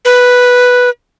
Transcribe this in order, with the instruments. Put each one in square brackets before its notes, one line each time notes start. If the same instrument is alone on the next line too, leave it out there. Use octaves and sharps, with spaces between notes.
[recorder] B4